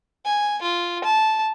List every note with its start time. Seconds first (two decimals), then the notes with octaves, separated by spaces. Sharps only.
0.25 G#5
0.62 F4
1.04 A5